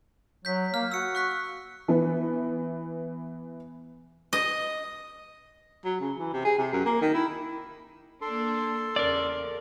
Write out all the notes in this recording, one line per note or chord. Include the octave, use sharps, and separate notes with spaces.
F#3 G6 B6
A#3 F6
F#4 E6 C#7
C#6 F#6 B6
E3 B3
D#5
F#3
C#3
E3
C3
G#4
C3
F#2
A#3
D#3
E4
A#3 D4 A4 C6
E2 C#3 A#4 D5